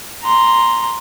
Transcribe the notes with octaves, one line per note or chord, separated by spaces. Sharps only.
A#5 C6